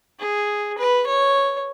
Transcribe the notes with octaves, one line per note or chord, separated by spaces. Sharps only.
G#4
B4
C#5